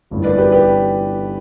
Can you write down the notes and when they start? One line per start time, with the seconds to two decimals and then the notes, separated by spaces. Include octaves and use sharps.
0.11 G1 G2 E3 G3 C#4
0.24 B4 D5
0.38 G4 B4
0.52 G4 B4